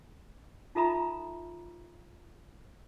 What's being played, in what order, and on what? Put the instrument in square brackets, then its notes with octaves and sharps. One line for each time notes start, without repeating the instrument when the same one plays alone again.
[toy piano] D#4 F4 A4 E5 A#5 B5